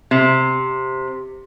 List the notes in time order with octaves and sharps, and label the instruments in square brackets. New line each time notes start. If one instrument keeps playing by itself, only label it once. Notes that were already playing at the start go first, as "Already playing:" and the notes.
[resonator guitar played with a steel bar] C3